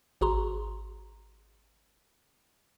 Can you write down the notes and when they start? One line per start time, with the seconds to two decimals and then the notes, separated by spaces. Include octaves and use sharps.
0.21 G#1 F#4 G#4 A#5 C6